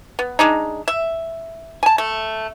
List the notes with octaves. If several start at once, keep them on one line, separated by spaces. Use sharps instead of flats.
B3
G#3 D4 D#4
E5
G#5 A5
A3